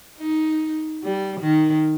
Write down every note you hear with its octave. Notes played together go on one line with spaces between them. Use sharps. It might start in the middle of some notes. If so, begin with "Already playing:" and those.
D#4
G3
D#3